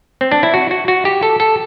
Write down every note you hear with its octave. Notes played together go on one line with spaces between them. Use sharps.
C4
D4
E4
F#4
F#4
F#4
G4
A4
A4